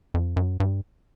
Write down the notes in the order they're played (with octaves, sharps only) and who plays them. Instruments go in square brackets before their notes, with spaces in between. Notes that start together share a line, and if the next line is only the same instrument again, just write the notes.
[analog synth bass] F2
F#2
G2